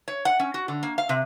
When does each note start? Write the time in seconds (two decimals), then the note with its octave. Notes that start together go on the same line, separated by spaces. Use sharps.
0.08 C#5
0.25 F#5
0.40 C#4
0.54 F#4
0.68 D3
0.83 A#3
0.98 F5
1.09 C3